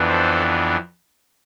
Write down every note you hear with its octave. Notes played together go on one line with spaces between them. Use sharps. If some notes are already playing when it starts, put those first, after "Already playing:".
Already playing: F2 E3 B3 D4
A4 C5